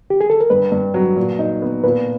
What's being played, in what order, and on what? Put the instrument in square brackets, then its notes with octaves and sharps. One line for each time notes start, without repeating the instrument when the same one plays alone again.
[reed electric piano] G4
G#4
A4
A#4
[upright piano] G2 [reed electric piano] B4
[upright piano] G2
F#3
A#2
D#4
B3
[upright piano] A#2 [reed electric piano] B4